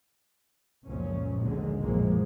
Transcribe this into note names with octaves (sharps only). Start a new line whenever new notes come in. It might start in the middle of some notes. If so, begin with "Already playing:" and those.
C#2 F#2 A#2 F3 C#4
A#1 D#2 B2 D3 G#3
A#1 F#2 E3 F3 G#3 A#3